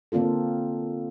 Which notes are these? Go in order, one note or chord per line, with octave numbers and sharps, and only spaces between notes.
D3 A#3 C4 F4 A4